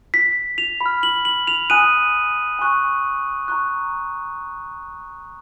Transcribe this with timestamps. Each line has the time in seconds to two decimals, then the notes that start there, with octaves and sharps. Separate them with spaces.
0.14 B6
0.58 F7
0.81 B5
0.86 F6
1.03 F#7
1.25 F#7
1.47 F7
1.70 G#5 D#6 F#6 D#7
2.59 G#5 C#6 F#6
3.48 A#5 C#6 F#6